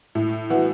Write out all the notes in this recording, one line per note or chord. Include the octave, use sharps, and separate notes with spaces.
A2
E3 B3 F#4